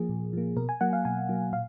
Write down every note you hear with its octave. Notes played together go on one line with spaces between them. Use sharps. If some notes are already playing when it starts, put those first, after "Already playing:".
Already playing: F3 A#3 G#4
A#2
F3 A#3
B2 A#4
G#5
F#3 A#3 F#5
F5
B2 G#5
F#3 A#3
A#2 F5